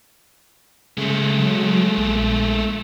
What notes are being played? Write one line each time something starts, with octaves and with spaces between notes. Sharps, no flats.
C#3 G#3 A3
F#3
A#1